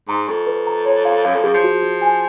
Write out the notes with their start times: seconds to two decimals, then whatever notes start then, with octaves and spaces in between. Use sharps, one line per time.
0.08 G#2 A#5
0.28 F2 C#6
0.47 B4
0.67 A#5
0.85 C#5
1.05 F5
1.25 F#2 F5
1.34 F2
1.44 F#2 G#4
1.54 F3
1.64 F#4
1.82 F#4
2.02 G#5